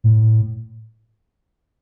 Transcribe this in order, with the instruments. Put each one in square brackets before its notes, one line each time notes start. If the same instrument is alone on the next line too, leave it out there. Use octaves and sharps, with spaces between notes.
[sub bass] A2